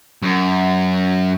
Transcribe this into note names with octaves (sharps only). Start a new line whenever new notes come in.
F#2